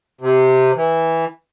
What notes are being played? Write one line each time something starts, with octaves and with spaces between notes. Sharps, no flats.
C3
E3